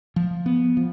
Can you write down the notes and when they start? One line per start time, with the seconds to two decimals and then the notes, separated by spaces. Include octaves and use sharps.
0.16 F3
0.46 B3
0.77 F3